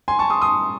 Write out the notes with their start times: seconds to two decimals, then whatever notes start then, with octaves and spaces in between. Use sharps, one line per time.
0.08 G#5 C6
0.19 A5 C#6
0.30 C6 D#6
0.42 C6 D#6